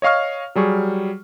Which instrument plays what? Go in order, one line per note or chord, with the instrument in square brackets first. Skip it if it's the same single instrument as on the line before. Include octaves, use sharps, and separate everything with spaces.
[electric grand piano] C#5 D#5 F5 C#6 F6
F#3 G3 G#4 C#6